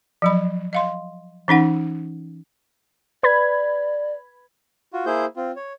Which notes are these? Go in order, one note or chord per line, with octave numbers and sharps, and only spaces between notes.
F3 F#3 B5
D#5 F5 C6
E3 C#4 D#4 F#5
B4 D5 B5 G#6
F4 F#4
A#3 E4 G#4 C5 G6
C4 F4
C#5